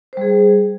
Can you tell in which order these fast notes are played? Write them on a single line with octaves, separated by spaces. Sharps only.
C5 G3 G#4